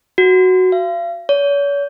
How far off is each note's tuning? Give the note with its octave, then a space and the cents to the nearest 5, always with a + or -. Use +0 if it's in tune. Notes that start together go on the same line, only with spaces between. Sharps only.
F#4 +0
F5 -40
C#5 +40